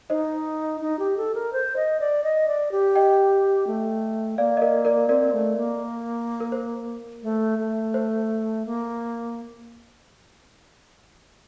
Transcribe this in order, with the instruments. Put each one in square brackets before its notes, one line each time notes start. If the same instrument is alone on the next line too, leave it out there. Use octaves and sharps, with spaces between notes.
[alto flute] D#4 [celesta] C5 D#5
[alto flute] D#4
G4
A4
A#4
C5
D#5
D5
D#5
D5
G4
[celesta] D#5 G5
[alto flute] A3
[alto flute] A#3 [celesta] D5 F5
[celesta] D#5
A#4 D5
A#4 D5
[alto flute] C4 [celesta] A#4 D5
[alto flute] A3
A#3
[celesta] A#4
C5
[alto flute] A3
A3
[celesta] C5
[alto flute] A#3